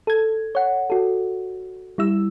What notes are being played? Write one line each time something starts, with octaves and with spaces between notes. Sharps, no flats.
A4 G#6
C#5 F#5
F#4 A4
G3 E4 E6